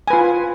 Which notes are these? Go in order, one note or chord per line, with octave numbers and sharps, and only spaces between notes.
F4 B4 G#5